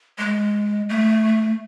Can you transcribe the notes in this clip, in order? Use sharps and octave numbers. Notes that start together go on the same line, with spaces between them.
G#3
A3